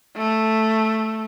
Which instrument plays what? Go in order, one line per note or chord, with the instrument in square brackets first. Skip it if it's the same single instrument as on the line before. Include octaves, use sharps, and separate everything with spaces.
[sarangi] A3